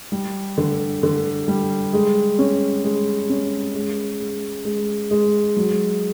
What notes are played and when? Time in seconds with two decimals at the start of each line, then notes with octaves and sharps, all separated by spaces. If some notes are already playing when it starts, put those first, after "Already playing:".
0.12 G3
0.57 D3
1.03 D3
1.48 G3
1.93 G#3
2.39 C#4
2.85 G#3
3.29 C#4
3.74 G#3
4.20 G#3
4.65 G#3
5.11 G#3
5.56 F#3